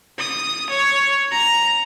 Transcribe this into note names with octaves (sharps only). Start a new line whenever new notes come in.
D#6
C#5
A#5